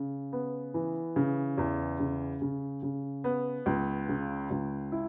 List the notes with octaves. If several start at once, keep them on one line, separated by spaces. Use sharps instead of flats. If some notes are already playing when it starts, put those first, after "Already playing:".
Already playing: C#3
B3
E3
C#3
E2
C#3
C#3
C#3
B3
C#2
C#3
C#2
E4